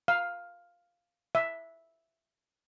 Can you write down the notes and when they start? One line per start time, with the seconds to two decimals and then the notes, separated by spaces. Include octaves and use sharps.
0.08 F5
1.35 E5